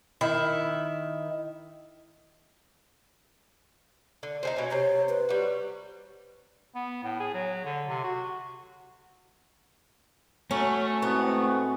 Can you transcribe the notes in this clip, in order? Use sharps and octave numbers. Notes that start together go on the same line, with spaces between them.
D#3 E4
D3
D#4 G#4 C5
B2 C#4
C3 C5 C#5
B4
G3 F#4
B3
A2
G#4
F#3
D3
C3
F#4
F#3 A3 C#4
A2 G#3 B3 C4 F#4